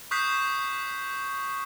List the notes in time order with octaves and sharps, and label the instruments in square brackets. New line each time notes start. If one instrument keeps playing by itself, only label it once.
[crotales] C#6 D#6 F#6 G6 B6 C7